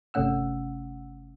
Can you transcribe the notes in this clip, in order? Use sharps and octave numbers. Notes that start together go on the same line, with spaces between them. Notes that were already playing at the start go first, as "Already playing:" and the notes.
G1 C3 A3 C#4 F#5 E6